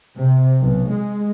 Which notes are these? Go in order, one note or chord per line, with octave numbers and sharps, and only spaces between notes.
C3
B1
G#3